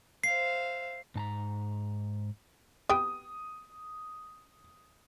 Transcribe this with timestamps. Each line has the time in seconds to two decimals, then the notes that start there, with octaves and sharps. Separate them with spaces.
0.24 C5 E5 F5 C7
1.15 G#2 A5 A#5
2.89 B3 G4 G5 D#6